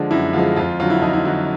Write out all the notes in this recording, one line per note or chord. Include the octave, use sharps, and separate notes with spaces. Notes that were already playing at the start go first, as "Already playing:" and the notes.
Already playing: D3 F3 G#3 D4
F#2 E4
D3 F3 G#3 F4
F2 F4
D3 F#3 F4
E4
F2 D#4
E4
D3 F#3